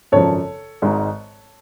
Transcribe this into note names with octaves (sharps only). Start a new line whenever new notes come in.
G#1 F#2 C#3 F3 A4 C#5
G#1 G#2 G#3